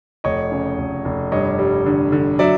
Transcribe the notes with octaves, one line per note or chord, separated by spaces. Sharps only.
F1 C#5 D#5
C#3
F1
F1
G2 C#5 D#5
G3
D3
D3
F#3 D5 E5